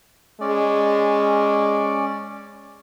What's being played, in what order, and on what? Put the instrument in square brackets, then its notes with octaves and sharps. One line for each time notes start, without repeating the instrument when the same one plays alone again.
[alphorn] G#3 [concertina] C#4 D5